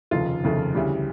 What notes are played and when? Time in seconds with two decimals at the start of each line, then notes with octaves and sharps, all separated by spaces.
0.11 F1 D#2 C#3 F3 A3 F4
0.44 F1 D#2 C#3 F3 A3
0.74 D2 C#3 E3 G3